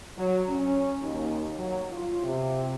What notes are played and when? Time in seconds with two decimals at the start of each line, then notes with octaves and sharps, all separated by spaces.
0.17 F#3
0.48 C#4
1.01 D#2
1.58 F#3
1.92 F4
2.23 C3